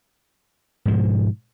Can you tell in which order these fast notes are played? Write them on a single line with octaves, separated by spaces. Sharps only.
G#2 F3 B2